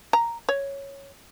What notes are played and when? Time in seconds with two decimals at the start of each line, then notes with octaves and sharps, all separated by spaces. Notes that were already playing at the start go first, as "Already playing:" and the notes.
0.13 A#5
0.49 C#5